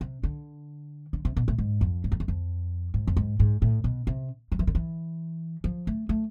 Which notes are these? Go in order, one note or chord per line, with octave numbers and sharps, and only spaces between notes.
C3
D3
D3
C3
B2
A2
G#2
F2
G#2
F2
E2
F2
G#2
F2
G#2
G#2
A2
B2
C3
F3
E3
D3
E3
F3
A3
A3